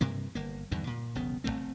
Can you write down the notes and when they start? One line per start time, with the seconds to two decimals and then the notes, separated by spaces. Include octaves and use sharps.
0.01 G2 C3 A#3
0.35 G1 A#3
0.71 E2 G2 D3 D#3
0.87 A#2
1.15 E1 B1 C#3 B3
1.44 F1 F2 A3 C4